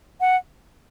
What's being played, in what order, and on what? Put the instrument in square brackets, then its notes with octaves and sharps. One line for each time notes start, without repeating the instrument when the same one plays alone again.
[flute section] F#5